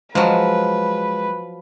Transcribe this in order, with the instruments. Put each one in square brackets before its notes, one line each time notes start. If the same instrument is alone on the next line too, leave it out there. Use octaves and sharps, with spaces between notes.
[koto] F3 F#3 [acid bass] G#3 [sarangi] B4